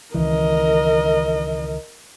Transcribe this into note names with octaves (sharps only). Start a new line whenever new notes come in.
C#2 D#3 E3 A#4 D#5